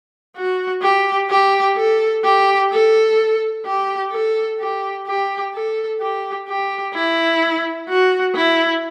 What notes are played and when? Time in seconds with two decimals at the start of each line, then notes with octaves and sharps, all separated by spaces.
0.36 F#4
0.82 G4
1.30 G4
1.77 A4
2.24 G4
2.71 A4
3.65 G4
4.12 A4
4.60 G4
5.07 G4
5.54 A4
6.00 G4
6.48 G4
6.94 E4
7.89 F#4
8.35 E4